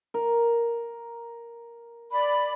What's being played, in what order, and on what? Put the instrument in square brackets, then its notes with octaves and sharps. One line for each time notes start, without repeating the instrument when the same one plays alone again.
[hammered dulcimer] A#4
[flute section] D5 B5